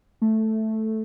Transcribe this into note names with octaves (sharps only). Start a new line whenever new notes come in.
A3